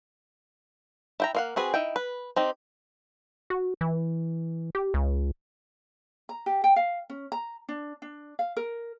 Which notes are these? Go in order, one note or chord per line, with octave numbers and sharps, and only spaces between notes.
E4 G5 A#5
A#3 F5 F#5
C4 F#4 G#4 B4
D#4 E4 G5
B4
C4 D#4 G4
F#4
E3
G4
C#2
A#5
G4
G5
F5
C#4
A#5
D4
D4
F5
A#4